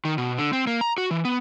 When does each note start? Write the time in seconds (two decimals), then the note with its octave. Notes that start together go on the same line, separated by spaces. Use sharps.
0.05 D#3
0.18 B2
0.38 D3
0.53 C4
0.67 A#3
0.81 A#5
0.98 F#4
1.11 E3
1.25 B3